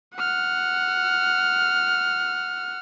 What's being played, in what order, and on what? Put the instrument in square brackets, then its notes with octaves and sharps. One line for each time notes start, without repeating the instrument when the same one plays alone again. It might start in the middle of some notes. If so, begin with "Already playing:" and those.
[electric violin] F#5 F6